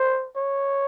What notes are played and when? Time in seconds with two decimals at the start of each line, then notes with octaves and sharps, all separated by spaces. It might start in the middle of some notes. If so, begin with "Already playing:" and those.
Already playing: C5
0.37 C#5